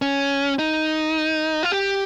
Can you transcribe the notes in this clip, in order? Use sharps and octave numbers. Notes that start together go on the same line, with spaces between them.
C#4
D#4
F4
G4